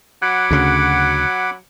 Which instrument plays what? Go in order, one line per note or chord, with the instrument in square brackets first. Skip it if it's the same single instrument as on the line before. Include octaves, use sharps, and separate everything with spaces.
[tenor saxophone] F#3 [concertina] F#5 B5 D6
[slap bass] D2 C#3